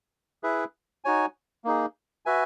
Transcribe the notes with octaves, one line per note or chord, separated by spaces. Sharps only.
E4 G#4 B4 E5
D#4 F#4 C#5 G#5
A#3 D#4 G#4
F#4 B4 E5 G#5